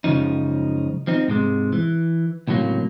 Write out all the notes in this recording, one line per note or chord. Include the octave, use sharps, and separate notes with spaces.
C#2 F#2 C#3 F3 D#4
F3 C4 D#4
G#2 C3 G#3
E3
C#2 A2 C3 F#3 A#3